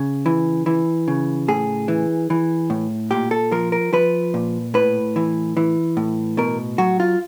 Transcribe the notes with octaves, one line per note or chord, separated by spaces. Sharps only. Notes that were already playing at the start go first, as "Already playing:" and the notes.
Already playing: C#3
E3
E3
C#3
A2 G#4
E3
E3
A2
A#2 G4
A4
F3 A#4
A#4
F3 B4
A#2
A2 B4
E3
E3
A2
B2 A#4
F#3 F#4
F4